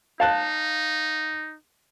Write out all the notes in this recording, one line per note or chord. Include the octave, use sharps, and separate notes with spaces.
D#4 F5 A5 F#6